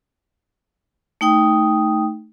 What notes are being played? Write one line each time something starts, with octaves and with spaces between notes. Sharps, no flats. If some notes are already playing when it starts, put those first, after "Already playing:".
A3 D#4 G5 D#6